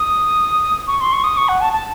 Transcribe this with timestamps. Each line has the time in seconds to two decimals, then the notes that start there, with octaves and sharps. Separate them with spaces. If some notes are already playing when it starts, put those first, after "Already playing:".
Already playing: D#6
0.87 C#6
1.01 C6
1.13 C#6
1.24 D#6
1.37 C#6
1.49 F#5
1.61 A5
1.73 A5